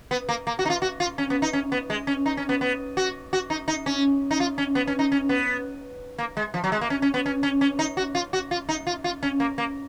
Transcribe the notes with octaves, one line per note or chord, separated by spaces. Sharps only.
B3
A#3
A#3
F#4
D#4
F4
F#4
F4
C#4
B3
D#4
C#4
B3
G#3
C#4
D#4
C#4
B3
B3
F#4
F#4
D#4
D#4
C#4
D#4
F4
C#4
B3
C#4
D#4
C#4
B3
A#3
G#3
F3
F#3
G#3
A#3
C#4
C#4
B3
C#4
C#4
C#4
D#4
F#4
F4
F#4
F4
D#4
F4
F4
C#4
A#3
A#3